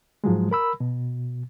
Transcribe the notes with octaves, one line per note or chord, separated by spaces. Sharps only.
G#2 F3 F#3 G#3
A#4 B5 E6
B2